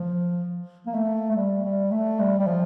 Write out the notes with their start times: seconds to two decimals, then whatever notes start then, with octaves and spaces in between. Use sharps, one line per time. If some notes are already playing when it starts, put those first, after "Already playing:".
Already playing: F3
0.87 A#3
0.94 A3
1.31 A3
1.36 G3
1.64 G3
1.91 A3
2.19 G3
2.39 G3
2.47 F3